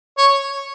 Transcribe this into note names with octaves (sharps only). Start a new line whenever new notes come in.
C#5